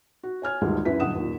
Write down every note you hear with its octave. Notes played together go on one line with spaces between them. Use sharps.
F#4
C#5 G#5 F6 G#6
D2 G2 A#2 D#3 G3 G#3
F#2 F#3 C#4 E4 B4 B6
B1 G2 D3 F#5 D#6 E7
D#2 A#2